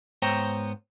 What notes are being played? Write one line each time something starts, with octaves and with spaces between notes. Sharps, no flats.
G#2 B3 C5 C#5 G5 A#5